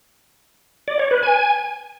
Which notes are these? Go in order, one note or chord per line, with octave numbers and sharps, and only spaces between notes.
D5
C#5
B4
G#5